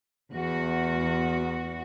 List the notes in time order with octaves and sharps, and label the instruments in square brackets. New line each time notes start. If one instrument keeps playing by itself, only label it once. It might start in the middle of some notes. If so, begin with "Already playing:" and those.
[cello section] E2 F#4